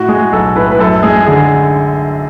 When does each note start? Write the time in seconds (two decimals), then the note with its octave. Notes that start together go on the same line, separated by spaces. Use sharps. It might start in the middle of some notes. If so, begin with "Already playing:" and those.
Already playing: A2 F#4
0.08 G#3 G#4
0.32 B1 A4
0.55 A2 B4
0.71 B4
0.79 F#2 A4
1.03 G#3 G#4
1.26 D3 G#4